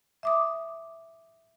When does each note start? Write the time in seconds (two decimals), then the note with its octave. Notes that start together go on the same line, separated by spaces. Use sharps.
0.23 E5 D6 D#6